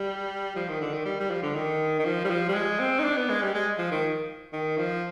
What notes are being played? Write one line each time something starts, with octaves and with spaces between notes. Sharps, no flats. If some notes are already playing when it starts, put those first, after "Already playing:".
Already playing: G3
F3
D#3
D3
D#3
G3
G3
F3
D3
D#3
D#3
F3
G3
F3
G3
G#3
C4
D#4
D4
B3
G#3
G3
G#3
F3
D#3
D#3
F3